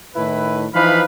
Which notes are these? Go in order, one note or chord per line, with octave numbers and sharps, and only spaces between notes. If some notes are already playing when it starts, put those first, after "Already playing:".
A2 D#3 E4 B4
E3 F3 D#4 B4 F5 B5